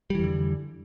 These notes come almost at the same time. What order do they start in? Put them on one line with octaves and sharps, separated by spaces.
G3 E3 F2 D3